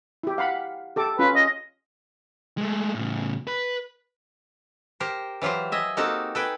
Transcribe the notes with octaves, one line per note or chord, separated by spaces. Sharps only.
E4 G4
F5 F#5 B5
G4 A4 D6
C#4 F4 B4
D#5
G#3 A3
A2 C#3
B4
G4 A#4 C5
E3 F#3 F4 G4 C5
D#5 E5 G#5
A#3 C4 D#4 F#4 G4 A4
A4 B4 G5 G#5